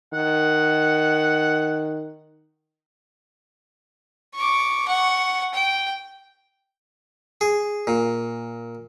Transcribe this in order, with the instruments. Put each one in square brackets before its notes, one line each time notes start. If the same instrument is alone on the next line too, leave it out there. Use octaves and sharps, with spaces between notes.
[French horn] D#3 [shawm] F#5
[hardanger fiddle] C#6 D6
F#5 C#6
G5
[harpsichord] G#4
A#2